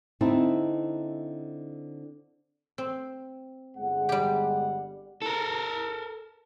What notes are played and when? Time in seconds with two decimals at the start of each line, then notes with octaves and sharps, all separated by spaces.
0.21 D3 C4 D#4 E4 E5 A5
2.78 C4
3.77 G1 G#3 F#5
4.09 G3 G4
5.22 A4 A#4